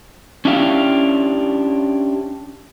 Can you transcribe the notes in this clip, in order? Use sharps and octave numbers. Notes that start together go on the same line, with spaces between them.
C#4 D4 E4 G4 F5